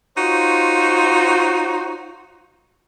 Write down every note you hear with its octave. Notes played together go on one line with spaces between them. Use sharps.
D#4 F4 F#4 C5 C#5